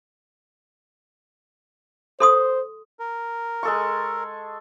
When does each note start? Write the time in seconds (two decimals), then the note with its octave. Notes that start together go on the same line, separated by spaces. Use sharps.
2.20 A4 C5 C6 D#6
2.99 A#4
3.63 G#3 A4 C#6